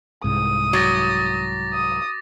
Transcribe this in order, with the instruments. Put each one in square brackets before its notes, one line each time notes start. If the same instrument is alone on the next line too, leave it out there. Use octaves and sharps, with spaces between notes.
[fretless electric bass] C2 G#2 [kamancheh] D#6
[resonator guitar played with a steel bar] F#3 [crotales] D6 A6 A#6
[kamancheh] D#6